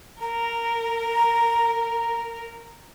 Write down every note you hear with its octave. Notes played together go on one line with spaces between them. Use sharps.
A#4 A#5